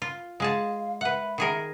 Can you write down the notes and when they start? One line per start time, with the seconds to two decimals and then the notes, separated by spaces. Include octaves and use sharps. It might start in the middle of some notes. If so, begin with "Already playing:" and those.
0.02 F4
0.40 G#3 G#4 F5 A5
1.01 B4 E5 F#5
1.38 D#3 G#4 A#4